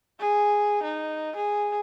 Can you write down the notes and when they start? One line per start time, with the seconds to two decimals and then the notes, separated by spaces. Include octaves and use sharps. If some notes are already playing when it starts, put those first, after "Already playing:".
0.19 G#4
0.83 D#4
1.36 G#4